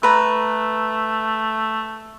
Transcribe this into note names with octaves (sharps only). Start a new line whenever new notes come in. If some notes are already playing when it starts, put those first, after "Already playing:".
A3 B4 A#5